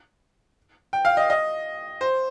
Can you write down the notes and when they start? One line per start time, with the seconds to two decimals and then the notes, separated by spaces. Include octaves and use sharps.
0.93 G5
1.05 F5
1.17 D#5
1.30 D#5
2.01 C5